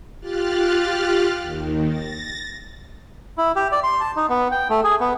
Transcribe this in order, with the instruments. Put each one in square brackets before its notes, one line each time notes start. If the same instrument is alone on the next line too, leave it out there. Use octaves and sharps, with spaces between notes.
[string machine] F4 G4 F6 F#6 A6
D#2 D#3
A6 A#6
[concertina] E4
G4
D5
C6
A5
D#4
B3
G5
A3
G#4
B3